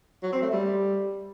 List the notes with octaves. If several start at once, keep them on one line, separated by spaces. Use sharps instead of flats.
F#3
C4
A3
G3